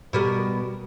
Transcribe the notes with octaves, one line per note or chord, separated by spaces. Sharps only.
B2 G3 A#4